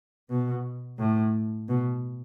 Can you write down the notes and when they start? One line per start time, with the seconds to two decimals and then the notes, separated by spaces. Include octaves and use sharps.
0.30 B2
0.99 A2
1.69 B2